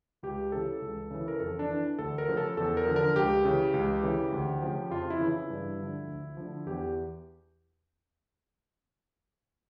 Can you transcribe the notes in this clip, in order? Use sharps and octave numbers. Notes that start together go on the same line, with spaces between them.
C#2 G4
C#3 E3 A4
C#2
C#3 E3
A#4
F2 A4
D4
E3
D2 A4
A#4
C#3 F3
A4
E2 A4
A#4
D3 F3
A#4
C#2 G4
C#3 E3
C#2
C#3 E3
D2
C#3 F3
F2 F4
E4
C#3 E3
E4
G2
D3 F3
D2
D3 F3
E2 G4